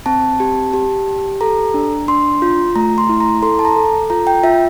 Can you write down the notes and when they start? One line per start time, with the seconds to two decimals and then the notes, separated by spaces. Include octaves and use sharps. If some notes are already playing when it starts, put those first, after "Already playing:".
0.06 C4 A5
0.40 G4
0.74 G4
1.07 G4
1.41 A4 A#5
1.74 D4
2.08 D4 C6
2.42 F4
2.76 A3 A#5
2.98 C6
3.09 E4
3.20 A#5
3.43 A4 C6
3.59 A5
3.65 A#5
3.76 A4
4.10 F4 A#5
4.27 G5
4.43 F4 E5